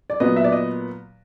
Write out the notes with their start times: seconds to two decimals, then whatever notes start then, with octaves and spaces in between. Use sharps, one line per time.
0.10 D5
0.20 A#2 F#3 B3 D#5
0.36 E5
0.44 D5
0.52 D#5